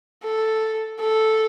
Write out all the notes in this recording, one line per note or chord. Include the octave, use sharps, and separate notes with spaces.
A4
A4